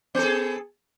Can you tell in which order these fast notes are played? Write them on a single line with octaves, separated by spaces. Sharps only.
B3 A4 G#4